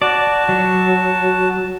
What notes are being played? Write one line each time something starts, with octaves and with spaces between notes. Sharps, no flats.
F#4 D5 A5
F#3